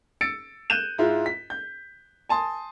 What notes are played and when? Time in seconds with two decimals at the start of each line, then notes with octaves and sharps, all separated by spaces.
0.21 E6 A6 C#7 D7
0.70 F#6 G6 D#7 E7
0.98 G#2 E4 F4
1.26 B6
1.50 G6
2.29 G#5 A5 C6 D#6